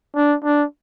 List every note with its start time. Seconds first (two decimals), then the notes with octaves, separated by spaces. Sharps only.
0.16 D4
0.45 D4